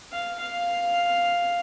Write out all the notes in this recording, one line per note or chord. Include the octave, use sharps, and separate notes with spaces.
F5
F5